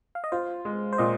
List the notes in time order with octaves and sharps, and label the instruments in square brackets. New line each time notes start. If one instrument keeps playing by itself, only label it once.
[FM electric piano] F5
D#5
[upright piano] F4 [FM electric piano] C5
[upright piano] G#3
[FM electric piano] C5
[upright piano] A#2 [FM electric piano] D#5